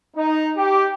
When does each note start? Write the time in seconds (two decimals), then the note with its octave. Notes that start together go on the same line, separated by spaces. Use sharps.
0.15 D#4
0.57 G4